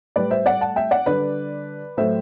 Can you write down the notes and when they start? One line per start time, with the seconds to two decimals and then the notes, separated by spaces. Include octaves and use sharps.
0.16 A2 G3 B4 D5
0.30 C5 E5
0.46 D5 F#5
0.61 F#5 A5
0.76 E5 G5
0.91 D5 F#5
1.06 D3 G3 B4 D5
1.97 A2 F#3 A3 C5 E5